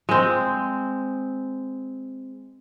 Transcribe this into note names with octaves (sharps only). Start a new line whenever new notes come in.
G#3 C4